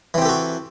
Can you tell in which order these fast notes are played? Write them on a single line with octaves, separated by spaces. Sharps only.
E3 C4 G4 A4 F#4